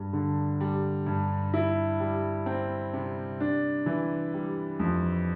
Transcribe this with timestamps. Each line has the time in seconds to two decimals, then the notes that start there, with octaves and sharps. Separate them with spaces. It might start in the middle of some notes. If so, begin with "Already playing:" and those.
Already playing: G2
0.13 D3
0.60 G3
1.06 G2
1.54 E4
2.00 G3
2.46 C4
2.93 C3
3.40 D4
3.86 E3
4.34 G3
4.79 F2